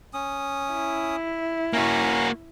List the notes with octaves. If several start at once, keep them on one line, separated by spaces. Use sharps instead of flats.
C#4 D#6
E4
A#3 C#4 F#4 A#5